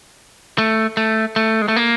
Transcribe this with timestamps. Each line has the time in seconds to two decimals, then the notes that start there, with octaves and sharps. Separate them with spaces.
0.58 A3
0.97 A3
1.36 A3
1.62 G#3
1.68 A3
1.76 A#3